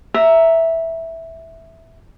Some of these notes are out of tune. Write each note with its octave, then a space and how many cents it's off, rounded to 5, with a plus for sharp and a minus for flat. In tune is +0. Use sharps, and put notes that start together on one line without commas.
E5 -5 A#5 +0